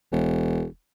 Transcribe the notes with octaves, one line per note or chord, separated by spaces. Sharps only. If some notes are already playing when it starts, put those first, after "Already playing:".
E1